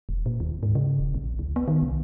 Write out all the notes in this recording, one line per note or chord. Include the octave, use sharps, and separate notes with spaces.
E1
A#2
D#2
G#2
C#3
D#1
A#1
D2
B3
D#3
C2